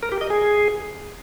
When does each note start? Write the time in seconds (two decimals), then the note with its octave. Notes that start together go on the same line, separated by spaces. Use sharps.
0.03 A#4
0.12 G4
0.21 D#5
0.30 G#4